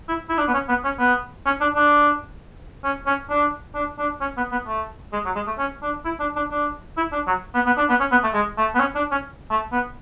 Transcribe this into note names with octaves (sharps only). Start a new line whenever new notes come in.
E4
E4
D4
B3
C#4
B3
C#4
B3
C#4
D4
D4
C#4
C#4
D4
D4
D4
C#4
B3
B3
A3
G#3
F#3
G#3
A3
C#4
D4
E4
D4
D4
D4
E4
D4
F#3
B3
B3
D4
B3
C#4
B3
A3
G#3
A3
B3
C#4
D4
C#4
A3
B3